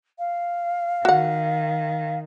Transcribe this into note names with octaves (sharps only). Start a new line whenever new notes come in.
F5
D#3 F#4 F#5